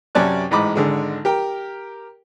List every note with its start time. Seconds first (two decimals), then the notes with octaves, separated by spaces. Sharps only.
0.15 F#2 C3 C#4 D5 A5 F#6
0.51 A1 G#2 D#5 B5 D6
0.76 G#1 D3 G#3
1.25 G4 A#4 G5